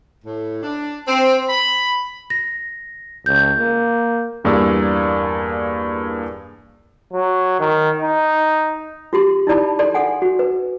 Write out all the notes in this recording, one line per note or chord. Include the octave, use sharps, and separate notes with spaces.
A2
D4
C4
B5
A#6
C#2 G6
A#3
E2 G2 A#3 G#4 D5 E6
F#3
D#3
D#4
F4 G4 C6
D#4 E4 D5 A5 B5
A4 D5 C6
A4 F#5 G#5
F#4
B4